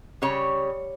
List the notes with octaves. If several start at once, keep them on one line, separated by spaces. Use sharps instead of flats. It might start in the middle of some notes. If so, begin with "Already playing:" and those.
C#3 G3 C#5